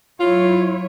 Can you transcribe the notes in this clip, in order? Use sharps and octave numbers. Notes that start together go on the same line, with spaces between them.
F#3 E4 F4 C#5